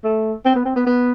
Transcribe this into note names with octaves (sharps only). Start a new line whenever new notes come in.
A3
C4
B3
C4
B3
B3